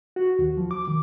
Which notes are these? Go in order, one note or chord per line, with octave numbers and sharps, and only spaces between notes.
F#4
D#2
F3
D6
D#3